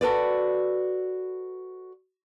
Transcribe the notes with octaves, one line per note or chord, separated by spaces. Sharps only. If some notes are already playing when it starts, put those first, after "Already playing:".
F#4 A4 B4 D5